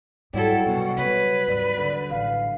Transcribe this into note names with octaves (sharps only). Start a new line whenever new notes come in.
G#2 F#3 G3 E4 A4
C2 B2
C#3 B3 B4 C#5
G#1 D#2 D5
D3
A1 F5